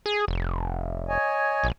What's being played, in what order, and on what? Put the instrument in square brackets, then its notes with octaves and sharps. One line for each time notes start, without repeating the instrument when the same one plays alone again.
[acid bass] G#4
F1
[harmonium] C#5 D#5 G#5
[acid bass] A#1